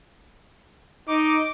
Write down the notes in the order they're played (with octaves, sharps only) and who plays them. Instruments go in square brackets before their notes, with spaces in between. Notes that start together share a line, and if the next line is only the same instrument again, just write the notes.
[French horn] D#4 [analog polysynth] D6